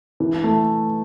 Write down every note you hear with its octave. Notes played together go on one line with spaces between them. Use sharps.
E3
A3